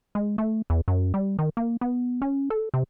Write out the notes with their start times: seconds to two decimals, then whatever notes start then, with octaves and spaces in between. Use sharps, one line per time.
0.15 G#3
0.38 A3
0.70 E2
0.88 F#2
1.14 G3
1.39 D#3
1.57 A#3
1.81 B3
2.22 C#4
2.50 A4
2.74 C3